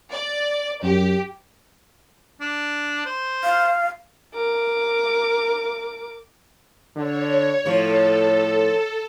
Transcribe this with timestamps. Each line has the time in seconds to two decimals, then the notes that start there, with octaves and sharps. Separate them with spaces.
0.11 D5
0.83 F#2 G4
2.41 D4
3.06 C5
3.44 F5
4.34 A#4 D6
6.96 D3 C#5
7.66 A2 F3 A4 C#5